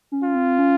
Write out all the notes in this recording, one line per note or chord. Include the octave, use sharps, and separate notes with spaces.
C#4
F4
C4
C#4